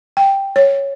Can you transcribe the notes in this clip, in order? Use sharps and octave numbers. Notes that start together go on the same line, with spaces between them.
G5
C#5